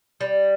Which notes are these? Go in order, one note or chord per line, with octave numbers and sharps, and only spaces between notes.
G3